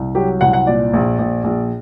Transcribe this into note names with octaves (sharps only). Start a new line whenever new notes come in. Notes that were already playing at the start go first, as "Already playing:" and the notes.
Already playing: C2
F#3 G4
C2 F#5
F#5
A#2 D5
A#1
A#1
A#1